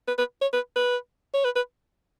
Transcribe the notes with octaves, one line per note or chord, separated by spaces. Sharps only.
B4
B4
C#5
B4
B4
C#5
B4
B4